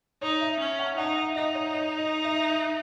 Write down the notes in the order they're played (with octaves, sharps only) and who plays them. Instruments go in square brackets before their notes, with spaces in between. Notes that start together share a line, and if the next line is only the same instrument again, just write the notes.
[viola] D#4 [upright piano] C#5
[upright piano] E5
[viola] C#4
[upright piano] F#5
[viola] D#4 [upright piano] F#5
[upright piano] E5
[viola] D#4 [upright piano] D#5
[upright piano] C#5
D#5
D#5
E5
E5